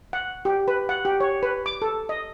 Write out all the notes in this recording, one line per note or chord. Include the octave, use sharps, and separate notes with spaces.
F#5
G4
B4
F#5
G4
C#5
B4
D6
A4
D#5